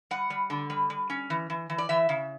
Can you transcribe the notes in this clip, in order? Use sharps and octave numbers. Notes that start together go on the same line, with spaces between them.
G3 F#5
G3
D3
G3
G3
C#4
E3
E3
E3
D5
E3 E5
C#3